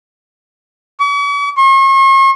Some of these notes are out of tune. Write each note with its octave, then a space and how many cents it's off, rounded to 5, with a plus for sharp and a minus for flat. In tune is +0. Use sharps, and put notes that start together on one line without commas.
C#6 +45
C#6 -45